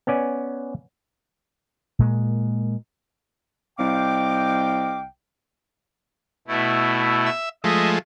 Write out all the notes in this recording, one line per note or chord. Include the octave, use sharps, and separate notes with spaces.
B3 C#4 D5 G#5
A#2 G#3 A#3
C2 D#5 F5 G5 D6
B2 A3 E4
E5
F3 G#3 A3 D#5 E5